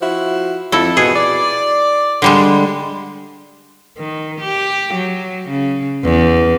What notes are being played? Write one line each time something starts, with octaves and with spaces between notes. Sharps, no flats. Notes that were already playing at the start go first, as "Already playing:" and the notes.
F3 E4 F#4
F2 E4 A4
B2 G#4
D5
D3 G3 G#3
D#3
G4
F#3
C#3
E2